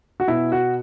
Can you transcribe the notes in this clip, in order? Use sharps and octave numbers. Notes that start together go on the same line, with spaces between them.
F#4
B2 E4
F#4